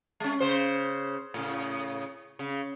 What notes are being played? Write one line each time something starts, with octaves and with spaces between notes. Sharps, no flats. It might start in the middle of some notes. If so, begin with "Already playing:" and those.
G#3 C#4
C#3 C5
A2 C#3
C#3